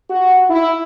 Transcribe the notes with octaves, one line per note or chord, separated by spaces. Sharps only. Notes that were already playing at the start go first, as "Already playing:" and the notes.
F#4
E4